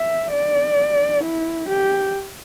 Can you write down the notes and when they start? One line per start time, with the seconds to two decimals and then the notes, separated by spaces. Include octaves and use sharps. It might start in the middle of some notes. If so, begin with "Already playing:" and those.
Already playing: E5
0.33 D5
1.23 E4
1.69 G4